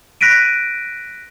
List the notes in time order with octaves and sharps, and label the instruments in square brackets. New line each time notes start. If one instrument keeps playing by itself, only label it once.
[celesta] F#6 A#6 B6 D7 D#7